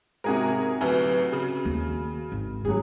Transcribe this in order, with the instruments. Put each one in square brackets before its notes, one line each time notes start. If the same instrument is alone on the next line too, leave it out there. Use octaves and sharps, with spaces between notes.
[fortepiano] G#2 C3 [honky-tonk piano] F#4 G#4 A#4
[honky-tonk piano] D2 A2 F#3 [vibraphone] G4 B4
[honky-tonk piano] C#3 [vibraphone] F#4
[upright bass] D#2
G#1
[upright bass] F#2 D#4 [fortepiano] F#3 G#4